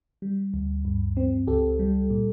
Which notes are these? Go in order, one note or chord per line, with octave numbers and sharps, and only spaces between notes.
G3
D2
G2
C4
C#2 G4 A4
G3
A#2